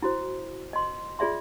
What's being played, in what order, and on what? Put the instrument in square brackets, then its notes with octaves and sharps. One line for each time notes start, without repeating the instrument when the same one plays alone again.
[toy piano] E4 F#4 C5
D#5 C6
F4 G#4 D5 E5 C6